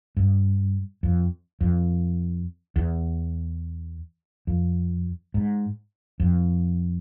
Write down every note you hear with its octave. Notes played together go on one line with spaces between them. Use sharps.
G2
F2
F2
E2
F2
G#2
F2